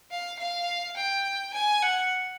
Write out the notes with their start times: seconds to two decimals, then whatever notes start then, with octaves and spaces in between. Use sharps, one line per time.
0.11 F5
0.39 F5
0.97 G5
1.53 G#5
1.82 F#5